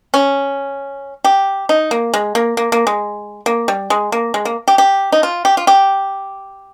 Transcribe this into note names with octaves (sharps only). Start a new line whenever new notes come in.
C#4
G4
D#4
A#3
G#3
A#3
A#3
A#3
G#3
A#3
G3
G#3
A#3
G#3
A#3
G4
G4
D#4
F4
G4
F4
G4